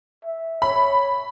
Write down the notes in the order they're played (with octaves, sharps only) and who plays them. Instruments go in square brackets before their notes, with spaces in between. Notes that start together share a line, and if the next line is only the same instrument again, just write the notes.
[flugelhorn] E5
[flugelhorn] C#5 [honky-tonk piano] B5